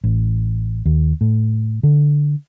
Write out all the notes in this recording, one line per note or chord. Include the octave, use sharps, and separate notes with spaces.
A1
D#2
A2
D3